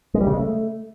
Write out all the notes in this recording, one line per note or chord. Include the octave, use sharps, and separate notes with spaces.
G#3
G3
C#3
G#3
A3